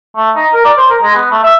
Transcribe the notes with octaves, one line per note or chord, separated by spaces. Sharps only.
A3
D#4
A#4
D5
C5
A#4
G#3
B3
A3
E5